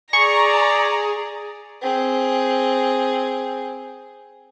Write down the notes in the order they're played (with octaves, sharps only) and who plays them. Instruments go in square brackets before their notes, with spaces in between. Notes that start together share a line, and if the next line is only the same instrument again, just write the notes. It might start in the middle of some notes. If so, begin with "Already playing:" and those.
[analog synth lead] G#4 [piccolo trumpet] D5 [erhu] A#5 [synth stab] C#6
[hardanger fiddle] C4 G#4